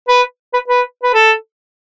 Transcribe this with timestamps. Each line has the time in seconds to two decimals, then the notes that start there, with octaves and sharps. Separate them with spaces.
0.08 B4
0.53 B4
0.68 B4
1.03 B4
1.14 A4